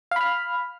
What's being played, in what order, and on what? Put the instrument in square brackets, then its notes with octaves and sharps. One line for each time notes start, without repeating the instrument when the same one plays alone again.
[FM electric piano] F5
B5
F6